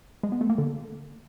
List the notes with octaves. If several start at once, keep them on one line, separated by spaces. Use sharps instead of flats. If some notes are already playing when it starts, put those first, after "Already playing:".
G#3
B3
A3
A#3
D3